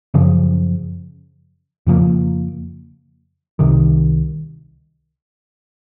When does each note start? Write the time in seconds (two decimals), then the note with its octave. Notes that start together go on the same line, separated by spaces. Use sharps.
0.14 F#2 C#3 F3
1.86 F2 C#3 F3 A#3
3.59 C2 C3 D#3